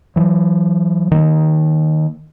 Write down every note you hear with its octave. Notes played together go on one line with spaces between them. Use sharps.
E3 F#3
D#3 A#3